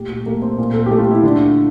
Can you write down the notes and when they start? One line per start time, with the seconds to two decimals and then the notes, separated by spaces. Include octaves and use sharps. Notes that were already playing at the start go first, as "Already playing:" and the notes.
Already playing: A#2 A3 G4
0.10 G4
0.26 A3 A#3
0.42 C4
0.58 A#2
0.73 A4
0.86 A3 G4
0.98 F4
1.11 E4
1.23 D3 D4